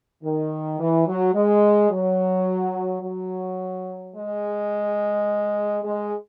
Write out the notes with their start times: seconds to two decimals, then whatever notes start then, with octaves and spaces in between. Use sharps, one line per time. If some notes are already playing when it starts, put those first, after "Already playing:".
0.23 D#3
0.79 E3
1.07 F#3
1.34 G#3
1.90 F#3
3.02 F#3
4.14 G#3
5.83 G#3